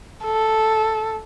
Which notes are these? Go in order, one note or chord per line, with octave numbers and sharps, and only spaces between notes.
A4